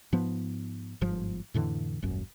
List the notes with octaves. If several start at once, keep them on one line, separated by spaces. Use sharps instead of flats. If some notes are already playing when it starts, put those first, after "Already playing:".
G#2 F3 B3
G1 G#2 F3
F2 A2 D3 E3
D#1 G#1 F#2